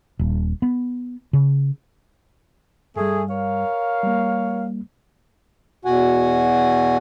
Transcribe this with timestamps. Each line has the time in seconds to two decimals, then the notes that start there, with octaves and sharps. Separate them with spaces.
0.19 D#1
0.62 B3
1.33 C#3
2.96 G2 G3 A3 G#4
3.30 A#4 C#5 F5
4.03 G3 A#3
5.85 E2 B2 F#4 F#5 G#5